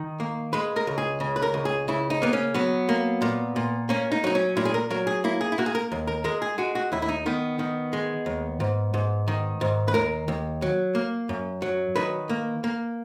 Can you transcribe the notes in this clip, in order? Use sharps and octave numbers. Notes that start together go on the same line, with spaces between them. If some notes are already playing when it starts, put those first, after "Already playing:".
Already playing: D#3
A#3
G#3 B4
A#4
C#2
G#4
C#3
B4
A#4
C#2
G#4
C#3 E4
D#4
A#3 B3
C#4
F#3 B3
A#3
A#2
A#2
A#3 C#4
D#4
F#3 D#4
C#4
A#2 E4
G#4
A#4
F#3 A#4
G#4
A#3 E4
G#4
E4
A#3 F#4
G#4
A#4
D#2
A#4
G#3 A#4
G#4
G#3 F#4
F#4
D#2 E4
E4
D#4
D#3 B3
D#3
G#3
D#2
G#2
G#2
D#3
G#2
B4
D#2 A#4
D#2
F#3
A#3
F#2
F#3
D#3 B4
A#3
A#3